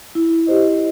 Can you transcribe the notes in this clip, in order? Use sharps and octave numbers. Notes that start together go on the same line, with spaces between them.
E4
G4 C5 D#5